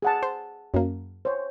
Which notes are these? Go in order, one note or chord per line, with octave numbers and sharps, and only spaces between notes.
G#4 F#5 A5
C5
F#2 A#3
C5 C#5